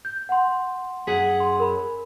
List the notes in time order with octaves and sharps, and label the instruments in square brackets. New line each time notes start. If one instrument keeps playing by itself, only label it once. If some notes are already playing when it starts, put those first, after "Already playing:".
[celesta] G6
F#5 C6
[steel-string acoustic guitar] F#2 G#4 F#5 [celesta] B6
[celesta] C6
A#4 B5